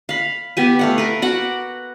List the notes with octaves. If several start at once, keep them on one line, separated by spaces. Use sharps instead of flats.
F5 B5
B3 G4 G#5
A3 F5 F#5
A#4 B4
F#4 F#5 D6